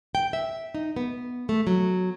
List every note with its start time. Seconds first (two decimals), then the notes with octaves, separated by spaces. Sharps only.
0.15 G5
0.33 E5
0.75 D#4
0.96 B3
1.49 A3
1.67 F#3